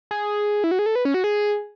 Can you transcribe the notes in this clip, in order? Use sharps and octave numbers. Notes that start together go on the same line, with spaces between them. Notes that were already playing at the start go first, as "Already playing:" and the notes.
G#4
E4
F#4
G#4
A4
B4
C#4
F#4
G#4